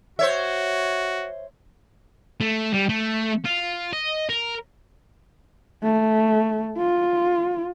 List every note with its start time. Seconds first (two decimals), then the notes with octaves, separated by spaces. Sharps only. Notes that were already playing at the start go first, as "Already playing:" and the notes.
0.19 F#4 C5 C#5 E5
2.41 A3
2.73 G3
2.89 A3
3.45 F4
3.93 D#5
4.29 A#4
5.83 A3
6.77 F4